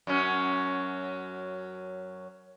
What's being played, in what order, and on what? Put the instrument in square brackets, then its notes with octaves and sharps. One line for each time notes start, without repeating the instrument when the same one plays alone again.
[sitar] F#2 F#3 C#4